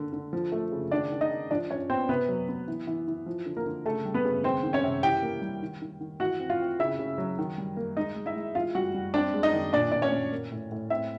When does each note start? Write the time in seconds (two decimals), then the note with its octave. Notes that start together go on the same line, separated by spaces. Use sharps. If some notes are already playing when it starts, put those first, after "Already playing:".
Already playing: D3 A#3
0.13 D3
0.33 F3
0.52 A3
0.72 C#3
0.92 D#3 D4 D5
1.12 D#3
1.21 D#4 D#5
1.31 D#3
1.51 F3 D4 D5
1.70 F3 C#4 C#5
1.89 B3 C4 C5
2.09 C3 B3 B4
2.29 F#3
2.49 B3
2.68 E3
2.87 E3
3.08 E3
3.26 F3
3.46 D3
3.56 A#3 A#4
3.66 D3
3.85 C#3 A3 A4
4.05 G3
4.14 B3 B4
4.25 C#3
4.44 D#3 C4 C5
4.63 D#3
4.73 C#4 C#5
4.84 C3
5.03 E3 G4 G5
5.22 A#3
5.42 G3
5.62 D#3
5.82 D#3
6.01 D#3
6.20 E3 F#4 F#5
6.39 C4
6.50 F4 F5
6.60 C4
6.79 C#3 E4 E5
6.99 C#3
7.18 F#3
7.39 D#3
7.58 G3
7.77 A#3
7.97 G#3 D#4 D#5
8.16 G#3
8.26 E4 E5
8.36 G#3
8.55 E3 F4 F5
8.75 G3 F#4 F#5
8.94 G3
9.14 C4 D4 D5
9.34 G#3
9.43 D#4 D#5
9.53 D#3
9.73 A#2 D4 D5
9.92 A#2 D5
10.02 C#4 C#5
10.12 A#2
10.32 A#3
10.51 A2
10.72 A2
10.90 C4 E4 E5